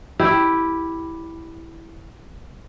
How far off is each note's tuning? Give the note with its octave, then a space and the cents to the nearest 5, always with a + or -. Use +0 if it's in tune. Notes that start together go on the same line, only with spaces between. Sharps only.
E4 +0 G4 +0 E5 +0